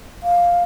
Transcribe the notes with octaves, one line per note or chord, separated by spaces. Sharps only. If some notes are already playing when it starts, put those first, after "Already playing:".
F5